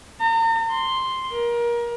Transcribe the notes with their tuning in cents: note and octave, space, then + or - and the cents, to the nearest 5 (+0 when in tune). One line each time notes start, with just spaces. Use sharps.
A#5 -45
C6 +0
A#4 +25